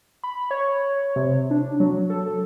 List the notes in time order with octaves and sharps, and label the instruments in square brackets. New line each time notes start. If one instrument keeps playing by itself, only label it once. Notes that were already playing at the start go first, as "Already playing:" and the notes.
[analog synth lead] B5
C#5
C3
D4
F#3
A4